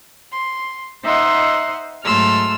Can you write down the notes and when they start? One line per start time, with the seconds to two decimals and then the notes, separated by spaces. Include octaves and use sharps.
0.32 C6
1.03 D#4 C5 D#5 E5 F#5 C6
2.04 G#2 F#3 A3 C6 E6 F6